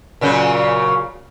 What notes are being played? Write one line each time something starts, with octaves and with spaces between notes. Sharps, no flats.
A#2 C#3 F#3